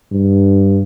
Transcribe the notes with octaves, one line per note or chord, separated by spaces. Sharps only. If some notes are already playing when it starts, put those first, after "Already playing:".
G2